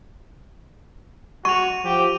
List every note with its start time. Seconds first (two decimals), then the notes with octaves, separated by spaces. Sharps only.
1.45 F#4 C#6 D#7 F7
1.84 F3 G4